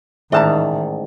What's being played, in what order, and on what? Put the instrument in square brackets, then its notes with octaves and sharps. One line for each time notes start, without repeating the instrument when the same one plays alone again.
[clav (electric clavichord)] A1 G#2 [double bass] D#3 [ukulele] D5 A5 A#5 [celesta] E5